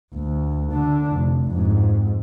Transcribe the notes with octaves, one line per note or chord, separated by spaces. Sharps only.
D2
D3 D4
F1
F2 G#2